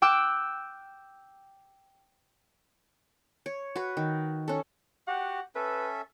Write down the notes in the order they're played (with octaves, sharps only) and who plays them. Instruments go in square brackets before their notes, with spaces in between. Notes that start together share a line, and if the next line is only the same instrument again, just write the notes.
[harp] G5 D6 E6 F#6
[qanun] C#5
F#4 B4
D#3
C#4 A4
[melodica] F#4 G4 [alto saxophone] F#5
[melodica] C#4 A4 E5 [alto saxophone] B4